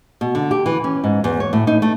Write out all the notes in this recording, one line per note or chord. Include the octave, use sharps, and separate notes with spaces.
B2
D3
G4
E3
C#4
G#2
E2
C#5
A2
D#4
A3